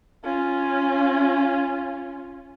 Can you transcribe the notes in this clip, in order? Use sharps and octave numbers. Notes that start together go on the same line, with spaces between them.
C#4 F4